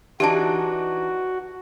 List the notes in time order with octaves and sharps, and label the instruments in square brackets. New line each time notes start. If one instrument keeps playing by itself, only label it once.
[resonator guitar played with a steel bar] E3 D4 D#4 [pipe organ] F#4 [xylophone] G4 A5